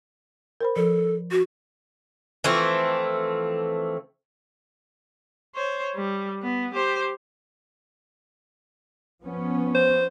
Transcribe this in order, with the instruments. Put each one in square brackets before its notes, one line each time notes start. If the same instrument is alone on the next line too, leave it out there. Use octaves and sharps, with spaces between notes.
[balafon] A#4 C5 B5
[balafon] F3 [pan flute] A4
[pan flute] F#4
[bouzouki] E3 F3 A3 C4
[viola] C5 C#5
G3
B3
G4 C5
[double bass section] F3 B3 C#4
[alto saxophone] C5